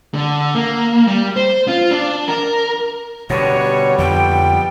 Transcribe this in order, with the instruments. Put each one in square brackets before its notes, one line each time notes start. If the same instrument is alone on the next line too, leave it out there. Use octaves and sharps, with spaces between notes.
[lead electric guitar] D3
A#3
G3
C5
F4
D4
A#4
[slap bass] B2 D3 [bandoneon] G3 B3 [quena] C#5
[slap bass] F2 D3 F3 [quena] G5